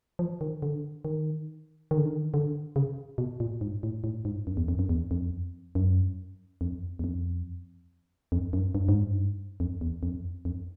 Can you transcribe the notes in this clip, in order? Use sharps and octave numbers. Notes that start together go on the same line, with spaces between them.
F3
D#3
D3
D#3
D#3
D3
D#3
D3
C#3
B2
A#2
G#2
A2
A2
G#2
F#2
E2
F2
F#2
E2
F2
F#2
F2
E2
F2
F2
F#2
G2
G#2
G2
F2
E2
F2
F2